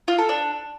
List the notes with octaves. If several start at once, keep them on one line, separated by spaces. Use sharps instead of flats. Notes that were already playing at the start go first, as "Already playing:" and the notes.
F4
A4
D4